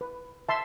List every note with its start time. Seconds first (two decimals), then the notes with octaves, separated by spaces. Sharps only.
0.01 B4
0.49 E5 A5 C6